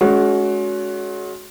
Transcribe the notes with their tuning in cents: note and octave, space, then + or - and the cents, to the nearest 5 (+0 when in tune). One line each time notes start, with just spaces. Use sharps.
G#3 +35 C#4 +30 F#4 +0